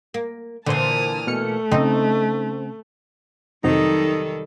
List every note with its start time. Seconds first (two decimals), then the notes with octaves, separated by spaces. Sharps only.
0.14 A#3
0.66 A#2 D3 E3 C5 A5 D#6 F6
1.27 B2 A3 F6 C#7
1.72 C#3 C4 C#4 D#4
3.64 F2 C3 D#3 F#3 G3 D#4 A4